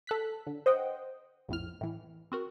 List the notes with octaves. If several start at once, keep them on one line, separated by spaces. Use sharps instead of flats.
A4 F#6 B6
D3
C5 D#5 F#5 G5
A#1 F2 A2 F6
A2 E3
C4 F#4 A#4